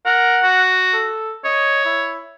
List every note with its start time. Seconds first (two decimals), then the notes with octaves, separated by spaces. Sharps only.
0.06 A#4 F#5
0.43 F#4
0.93 A4
1.45 C#5 D#5
1.85 E4